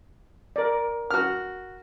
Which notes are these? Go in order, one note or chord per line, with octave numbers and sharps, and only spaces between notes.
A#4 D5
F#4 F6